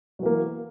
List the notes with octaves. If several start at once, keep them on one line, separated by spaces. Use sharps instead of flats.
E3 F#3 A#3